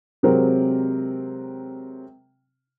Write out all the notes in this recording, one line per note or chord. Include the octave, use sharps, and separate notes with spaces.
C3 F#3 G#3 C4 A#4